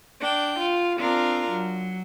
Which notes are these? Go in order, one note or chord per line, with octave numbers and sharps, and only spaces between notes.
D4 G5
F4
C4 D4 F4 A#4
F#3